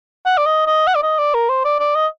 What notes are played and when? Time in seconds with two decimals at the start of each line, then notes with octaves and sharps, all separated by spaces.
0.26 F#5
0.38 D5
0.46 D#5
0.66 D#5
0.87 F#5
0.95 D5
1.03 D#5
1.18 D5
1.34 A#4
1.49 C5
1.65 D5
1.80 D5
1.95 D#5